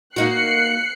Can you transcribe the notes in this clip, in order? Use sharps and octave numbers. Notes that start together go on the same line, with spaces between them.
A#3 D#4 F#4 F#6 C7 C#7